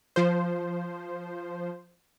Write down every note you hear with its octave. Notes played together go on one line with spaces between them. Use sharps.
F3 C5